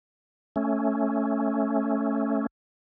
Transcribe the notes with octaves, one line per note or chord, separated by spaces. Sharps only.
A3 C#4